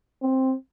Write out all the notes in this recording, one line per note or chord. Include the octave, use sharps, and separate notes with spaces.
C4